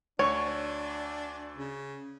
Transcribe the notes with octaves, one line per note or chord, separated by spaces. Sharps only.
D2 D4 C#5 C#6
C#3